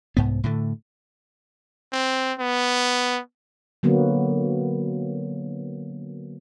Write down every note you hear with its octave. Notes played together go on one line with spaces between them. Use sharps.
C2 G#2 B3
A2 D3 A3
C4
B3
D3 F#3 A#3 B3